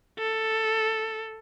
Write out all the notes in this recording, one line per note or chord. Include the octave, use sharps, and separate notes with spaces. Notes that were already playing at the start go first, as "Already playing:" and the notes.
A4